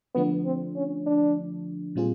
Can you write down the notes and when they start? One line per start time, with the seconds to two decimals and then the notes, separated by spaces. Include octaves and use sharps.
0.15 D3 F3 A3 B3 D4
0.45 C4
0.76 C#4
1.06 D4
1.96 A#2 G3 C4 F4 G#4